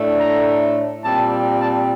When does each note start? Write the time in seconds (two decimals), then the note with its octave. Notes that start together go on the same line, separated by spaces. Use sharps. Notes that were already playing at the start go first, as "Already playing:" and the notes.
Already playing: A2 A3 D4
0.18 A#5
1.03 A#2 G3 C4 A5
1.60 A5